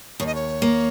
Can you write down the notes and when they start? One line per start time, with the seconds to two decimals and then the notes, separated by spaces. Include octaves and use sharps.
0.20 D#2 C#5
0.26 D#5
0.35 C#5
0.62 A#3